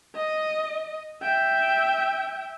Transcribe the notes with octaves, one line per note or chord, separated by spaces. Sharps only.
D#5
E5 G5